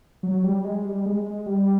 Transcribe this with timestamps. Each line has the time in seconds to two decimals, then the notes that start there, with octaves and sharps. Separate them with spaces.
0.23 F#3
0.44 G3
0.64 G#3
0.85 G3
1.06 G#3
1.26 G#3
1.46 G3